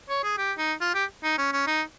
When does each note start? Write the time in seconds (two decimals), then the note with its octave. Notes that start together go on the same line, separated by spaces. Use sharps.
0.09 C#5
0.23 G#4
0.37 G4
0.58 D#4
0.81 F4
0.94 G4
1.23 D#4
1.38 C#4
1.52 C#4
1.67 D#4